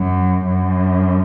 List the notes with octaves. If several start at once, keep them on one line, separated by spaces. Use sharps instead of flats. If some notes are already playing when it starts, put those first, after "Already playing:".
Already playing: F#2
F#2